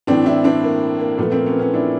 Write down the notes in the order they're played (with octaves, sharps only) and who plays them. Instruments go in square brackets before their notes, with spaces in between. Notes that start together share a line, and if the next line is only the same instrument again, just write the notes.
[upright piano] A2 E3 C4 D4
D4 E4
C4 D4
A#3
A#3
A#2 F3 A3 B3
A#3 C4
B3 C#4
B3 C#4
D4 E4